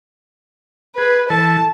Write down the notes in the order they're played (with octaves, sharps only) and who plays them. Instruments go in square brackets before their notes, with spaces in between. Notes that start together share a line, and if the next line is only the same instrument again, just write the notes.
[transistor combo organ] G#4 [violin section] B4
[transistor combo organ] E3 A4 [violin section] A5